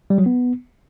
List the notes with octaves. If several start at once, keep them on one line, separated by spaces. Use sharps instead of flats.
G3
F#3
B3